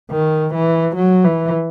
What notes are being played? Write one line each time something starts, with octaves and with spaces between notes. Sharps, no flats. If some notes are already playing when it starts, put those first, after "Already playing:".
D#3
E3
F#3
E3